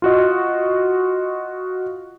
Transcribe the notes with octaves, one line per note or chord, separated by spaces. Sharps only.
F4 F#4 D#5